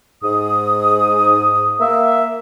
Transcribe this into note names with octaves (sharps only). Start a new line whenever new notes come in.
G#2 D#6
A#3 E5